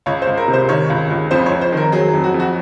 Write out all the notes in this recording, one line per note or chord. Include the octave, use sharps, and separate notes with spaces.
C#2 C#5
C5
C#2
A#4
C3
C5
D#3 C#5
C#2
C#2
F2 C5
C#5
F2
C5
D#3 A#4
F#3 G#4
G#4
F2
F#4
F2
F#4